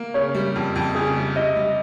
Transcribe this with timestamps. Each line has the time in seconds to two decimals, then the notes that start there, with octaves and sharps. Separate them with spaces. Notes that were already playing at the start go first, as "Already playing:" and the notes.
Already playing: A#3
0.14 C#3 C#5
0.35 G3
0.56 F2
0.75 F2
0.95 C#3 G#4
1.16 G3
1.36 C3 D#5
1.56 G3